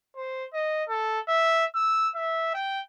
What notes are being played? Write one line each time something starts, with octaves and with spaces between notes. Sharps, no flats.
C5
D#5
A4
E5
E6
E5
G5